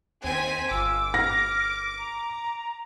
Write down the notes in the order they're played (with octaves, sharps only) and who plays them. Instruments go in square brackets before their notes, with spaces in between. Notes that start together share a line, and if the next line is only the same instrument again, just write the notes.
[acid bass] D#2 [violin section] C4 G#5 B6
[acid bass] G1 [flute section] F4 G#5 E6 [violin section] D6
[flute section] F6 [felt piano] A#6
[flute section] A#5